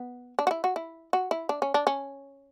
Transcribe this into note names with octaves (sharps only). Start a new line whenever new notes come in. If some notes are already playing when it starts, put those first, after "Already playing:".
Already playing: B3
D4
F#4
E4
F#4
E4
F#4
E4
D4
C#4
D4
C#4